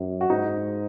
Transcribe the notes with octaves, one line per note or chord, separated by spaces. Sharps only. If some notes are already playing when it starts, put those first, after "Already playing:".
Already playing: F#2
F#4
G#2 D#4